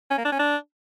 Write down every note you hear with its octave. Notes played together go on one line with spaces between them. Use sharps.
C#4
A#3
D4
C#4
D4